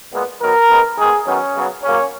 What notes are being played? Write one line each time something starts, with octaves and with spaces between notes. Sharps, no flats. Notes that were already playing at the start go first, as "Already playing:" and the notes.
A#2 G#3 B3
D#3 F#3 B3 A#4
D#3 G#3 B3
D#3 G#3 B3 G#4
D#3 F#3 B3 C#4
C#3 F#3 B3
C#3 F#3 A#3 C#4